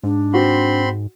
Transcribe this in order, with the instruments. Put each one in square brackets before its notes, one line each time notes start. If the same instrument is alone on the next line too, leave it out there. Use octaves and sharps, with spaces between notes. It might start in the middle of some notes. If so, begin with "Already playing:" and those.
[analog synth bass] G#2 [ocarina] D4
[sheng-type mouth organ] C4 B5 C6 [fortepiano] F#4